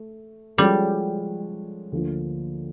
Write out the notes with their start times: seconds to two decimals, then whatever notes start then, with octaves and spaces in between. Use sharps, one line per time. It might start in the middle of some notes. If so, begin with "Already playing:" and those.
Already playing: A3
0.58 F3 G3 G#3 C#4 F#4 A4
1.92 D2 D3 F3 A#3